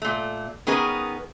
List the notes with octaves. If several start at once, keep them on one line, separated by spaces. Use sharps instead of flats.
A#2 A3
D#3 B3 C#4 G#4 A#4 B4